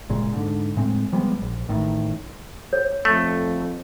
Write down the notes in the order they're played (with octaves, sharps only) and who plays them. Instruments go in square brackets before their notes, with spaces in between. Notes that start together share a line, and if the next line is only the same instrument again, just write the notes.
[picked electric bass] F#1 A#2 G#3
G#2 D3
A2 G#3 C4
F3 G3 G#3 B3
A#1
A1 A2 D#3
[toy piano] C#5
[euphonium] F2 [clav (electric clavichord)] A3